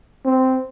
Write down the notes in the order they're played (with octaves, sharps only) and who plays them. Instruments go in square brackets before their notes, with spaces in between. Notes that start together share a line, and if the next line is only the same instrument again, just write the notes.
[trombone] C4